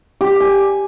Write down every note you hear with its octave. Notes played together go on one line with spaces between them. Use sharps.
G4
G#5